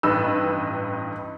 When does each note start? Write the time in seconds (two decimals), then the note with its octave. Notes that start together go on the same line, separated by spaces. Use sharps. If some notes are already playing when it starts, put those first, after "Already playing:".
0.03 A1 G2 D#4 B4 E6